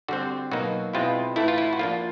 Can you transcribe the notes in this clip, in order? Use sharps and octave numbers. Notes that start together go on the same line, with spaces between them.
D3 G3 C4 F#4
B2 F#3 A#3 D#4 F#4
B2 G#3 C4 E4 F4
A2 E3 A3 E4
F4
E4
F#4
F3 A#3 D4 F4